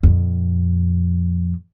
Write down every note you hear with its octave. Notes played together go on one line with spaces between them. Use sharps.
F2 A#2